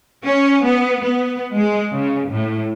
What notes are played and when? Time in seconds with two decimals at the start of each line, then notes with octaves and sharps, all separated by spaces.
0.24 C#4
0.65 B3
1.02 B3
1.56 G#3
1.94 C#3
2.30 A2